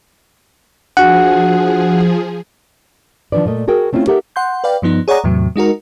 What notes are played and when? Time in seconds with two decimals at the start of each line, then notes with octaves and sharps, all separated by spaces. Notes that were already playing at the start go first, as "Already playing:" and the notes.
0.97 F3 D4 F#4 G#4 F#5 G#5
3.32 D#3 F3 D4 B4 D5
3.46 A#2 A3 D#5
3.68 F#4 G#4 A#4 G5
3.93 A3 C4 C#4 E4 F4
4.07 D#4 G4 A4 A#4 E5 F#5
4.36 F#5 C6 G6
4.64 B4 D5 F5 G5
4.82 G2 F3 B3 D#4
5.08 G#4 C#5 D5 F#5 A#5 D#6
5.24 E2 A2 C3 F#3
5.56 G#3 D#4 F#4 A#4